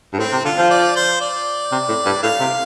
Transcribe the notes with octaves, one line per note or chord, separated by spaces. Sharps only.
G2
A2 C4
C3
D3 F4
F3
D5
C5
D5
C3
A2
G2
A2 F5
C3